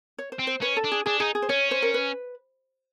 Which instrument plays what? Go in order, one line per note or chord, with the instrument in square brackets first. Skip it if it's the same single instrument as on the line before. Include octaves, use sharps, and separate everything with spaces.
[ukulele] C#5
C5
[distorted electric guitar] C4
[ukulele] C5
[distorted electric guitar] C#4 [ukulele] B4
[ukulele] A4
[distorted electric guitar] D4
[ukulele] G#4
[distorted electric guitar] D4 [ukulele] G#4
[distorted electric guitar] D#4 [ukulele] G#4
[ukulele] G#4
C5
[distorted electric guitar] C#4 [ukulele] C#5
[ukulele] C5
A#4
B4